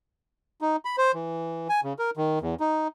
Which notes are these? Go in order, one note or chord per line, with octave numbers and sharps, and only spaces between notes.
D#4
B5
C5
E3
G#5
C#3
A#4
D#3
E2
D#4